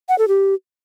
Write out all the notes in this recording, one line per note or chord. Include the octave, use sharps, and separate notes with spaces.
F#5
A4
G4